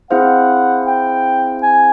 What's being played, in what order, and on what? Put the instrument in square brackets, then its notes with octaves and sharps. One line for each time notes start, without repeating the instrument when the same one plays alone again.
[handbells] C4 E4 G#4 C5 F5 [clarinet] F#5
[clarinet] G5
G#5